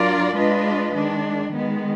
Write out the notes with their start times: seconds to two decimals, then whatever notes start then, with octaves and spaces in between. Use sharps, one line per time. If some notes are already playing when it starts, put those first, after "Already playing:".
Already playing: F#3 D4 F4 A#4 D5
0.35 G#3 D4 F4 B4 D#5
0.93 D#3 G#3 D4
1.51 D#3 G#3 B3